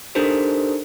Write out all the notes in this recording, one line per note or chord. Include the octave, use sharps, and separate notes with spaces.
D4 D#4 G4 A4 A#4 C5